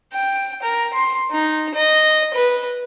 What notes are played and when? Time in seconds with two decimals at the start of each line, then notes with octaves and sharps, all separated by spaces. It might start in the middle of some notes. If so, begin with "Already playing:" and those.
0.13 G5
0.63 A#4
0.93 C6
1.31 D#4
1.75 D#5
2.34 B4